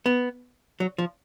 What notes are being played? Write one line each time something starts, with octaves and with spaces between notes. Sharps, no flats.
B3
F#3
F3